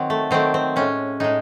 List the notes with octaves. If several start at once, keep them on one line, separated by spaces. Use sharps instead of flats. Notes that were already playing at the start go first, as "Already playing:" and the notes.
Already playing: D#3 F#3 C4
A3
D#3 F#3 A3 C4
C4
A2 G#3 C#4
A2 G#3 D#4